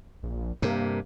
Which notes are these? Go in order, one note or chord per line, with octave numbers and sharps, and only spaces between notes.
A#1
G2 C3 A#3